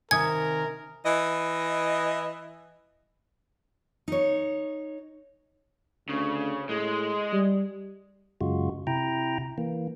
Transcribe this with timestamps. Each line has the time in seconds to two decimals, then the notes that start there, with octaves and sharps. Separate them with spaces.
0.11 C3 D#3 A#4 E5 G#5 D#6 G#6
1.05 E3 D#5
4.08 D#4 C#5
6.09 D2 C#3
6.69 A2 G#3
7.33 G3
8.41 F#2 C#3 G#3 F4 F#4
8.87 C3 E4 G5 A#5
9.58 E3 A#3